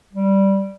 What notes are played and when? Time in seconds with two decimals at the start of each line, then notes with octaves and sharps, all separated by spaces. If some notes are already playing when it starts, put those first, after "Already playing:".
0.13 G3